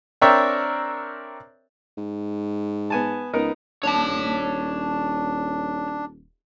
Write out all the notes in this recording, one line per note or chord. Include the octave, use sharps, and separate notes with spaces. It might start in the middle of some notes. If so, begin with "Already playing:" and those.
C4 D4 A#4 C#5 E5 G5
G#2
B3 G#5 A5
C#2 B3 D#4 A#4
D#1 D4 C#5 A5